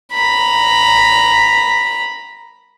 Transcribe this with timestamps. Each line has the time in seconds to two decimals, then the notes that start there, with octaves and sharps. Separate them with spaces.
0.13 A#5 B5